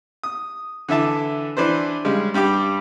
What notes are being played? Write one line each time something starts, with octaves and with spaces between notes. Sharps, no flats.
D#6
D3 E3 E5 A5 D6
E3 D4 B4 C5
C#3 G3 G#3
G2 G3 G4 D6